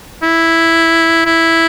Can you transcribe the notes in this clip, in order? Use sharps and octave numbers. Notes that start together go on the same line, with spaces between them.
E4
E4